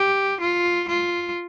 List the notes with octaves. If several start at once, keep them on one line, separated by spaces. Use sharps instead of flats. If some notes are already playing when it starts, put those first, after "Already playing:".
Already playing: G4
F4
F4